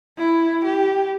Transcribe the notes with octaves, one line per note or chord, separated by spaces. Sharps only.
E4
G4